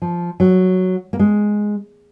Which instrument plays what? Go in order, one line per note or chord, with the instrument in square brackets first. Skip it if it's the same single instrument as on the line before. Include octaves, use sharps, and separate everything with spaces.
[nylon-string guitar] F3
F#3
A#3
G#3